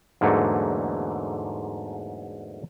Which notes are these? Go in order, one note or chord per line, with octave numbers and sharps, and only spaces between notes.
E2 G#2 D3 F#3 A3 A#3